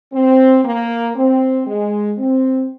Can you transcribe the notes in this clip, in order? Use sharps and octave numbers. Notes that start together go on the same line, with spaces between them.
C4
A#3
C4
G#3
C4